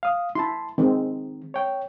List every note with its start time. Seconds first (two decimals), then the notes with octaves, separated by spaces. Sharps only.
0.03 F5 D#6
0.35 E4 A5 C6
0.78 D#3 G#3 C4
1.54 C#5 G5